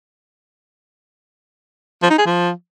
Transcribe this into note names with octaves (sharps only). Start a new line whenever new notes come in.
F3
D#4
G#4
F3